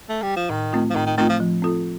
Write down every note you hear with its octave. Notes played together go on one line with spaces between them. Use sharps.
A3
G3
F3
A2 D#3
A3 C4 F4
F3
A2 D#3
D#3
D#3 A3 C4 F4
F3
F3
C4 F4 A4